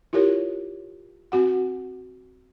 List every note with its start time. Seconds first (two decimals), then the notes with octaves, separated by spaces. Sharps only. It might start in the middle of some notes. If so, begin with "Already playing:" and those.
0.13 E4 F4 G4 A#4 C#5
1.32 C4 F#4 F#5